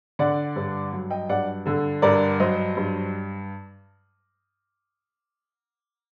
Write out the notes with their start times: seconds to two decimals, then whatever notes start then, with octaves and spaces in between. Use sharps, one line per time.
0.19 D3 D5 F#5
0.56 G2
0.93 F#3
1.10 D#5 G5
1.29 G2 D5 F#5
1.66 D3 A4
2.02 G2 A#4 D5
2.40 F#3 C5 D#5
2.77 G2